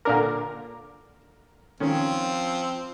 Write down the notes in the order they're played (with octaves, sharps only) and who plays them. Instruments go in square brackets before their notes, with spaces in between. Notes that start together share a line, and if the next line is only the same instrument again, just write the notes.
[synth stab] A#2 D3 A#4 [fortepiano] D6
[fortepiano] D#3 C#4 [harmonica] F3 C4